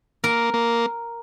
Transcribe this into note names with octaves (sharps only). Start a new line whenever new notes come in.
A#3 A#4
A#3